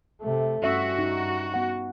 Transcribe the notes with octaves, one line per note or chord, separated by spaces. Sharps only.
C3 A3
G2 C#4 F#4 E5
D#4
B3 F#5